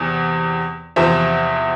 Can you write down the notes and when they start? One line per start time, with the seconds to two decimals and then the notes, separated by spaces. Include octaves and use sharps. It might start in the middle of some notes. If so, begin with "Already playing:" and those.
Already playing: E2 C3
0.96 E2 C3 F3 C5 E5